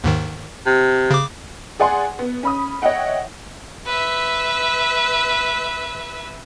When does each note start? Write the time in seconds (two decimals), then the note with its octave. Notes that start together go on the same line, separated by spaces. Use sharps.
0.04 D#2 G#2 D#3
0.66 C3
1.10 C#3 D6
1.80 G#4 D5 F#5 G#5 C6
2.19 B3
2.43 C#4 B5 D#6
2.82 C#5 D#5 E5 F#5 G5
3.86 B4 E5